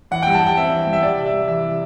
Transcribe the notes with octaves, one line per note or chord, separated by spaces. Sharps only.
E3 F#5
G2 G5
A5
G3 G5
C4 E5
E3
G2
E5
G3 D5
C3
E5
G3
E3 E5
C3